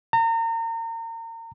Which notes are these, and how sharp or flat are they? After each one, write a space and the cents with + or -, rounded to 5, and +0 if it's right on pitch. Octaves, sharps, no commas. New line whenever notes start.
A#5 -35